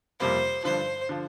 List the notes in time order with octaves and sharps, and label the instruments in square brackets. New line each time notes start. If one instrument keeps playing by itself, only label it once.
[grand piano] F2 C3 G3 A#3 [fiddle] C5
[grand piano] G2 D3 F3 [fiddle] C5
[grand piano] D3 F3